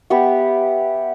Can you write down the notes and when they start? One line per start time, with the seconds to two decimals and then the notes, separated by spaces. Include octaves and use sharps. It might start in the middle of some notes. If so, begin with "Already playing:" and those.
0.10 B3 G4 E5 F#5